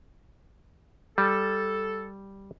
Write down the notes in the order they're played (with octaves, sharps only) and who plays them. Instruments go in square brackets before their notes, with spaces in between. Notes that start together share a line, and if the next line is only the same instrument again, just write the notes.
[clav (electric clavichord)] G3 [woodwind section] A4